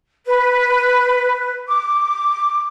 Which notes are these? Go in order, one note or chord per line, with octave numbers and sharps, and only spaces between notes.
B4
D6